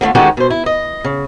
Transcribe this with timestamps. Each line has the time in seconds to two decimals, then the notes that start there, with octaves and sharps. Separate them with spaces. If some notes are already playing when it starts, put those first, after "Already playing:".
0.01 D3 G3 A3 F4
0.15 D3 D#3 G#3 C#4 F#4 G4
0.37 B2 C5
0.50 E4
0.66 D#5
1.04 C#3